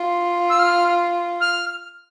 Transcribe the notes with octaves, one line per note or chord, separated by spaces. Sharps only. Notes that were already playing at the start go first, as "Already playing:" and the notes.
Already playing: F4
E6
F6
F6